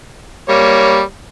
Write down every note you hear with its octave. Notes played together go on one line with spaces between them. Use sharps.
G3 A#3 C#5